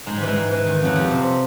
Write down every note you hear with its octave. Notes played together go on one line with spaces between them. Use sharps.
G#2 G#3
E3 G3
G#3
G#2
E3
D#3
F2 F#3
F2 G3
C3